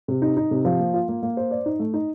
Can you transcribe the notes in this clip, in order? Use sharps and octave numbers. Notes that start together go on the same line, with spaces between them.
C3
D#4
D#4
C3
F3
A#3
F4
A#3
A#3
C5
D5
D#4
A3
D#4